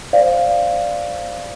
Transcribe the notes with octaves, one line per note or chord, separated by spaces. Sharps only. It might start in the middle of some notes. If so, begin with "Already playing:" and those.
C5 D5 F5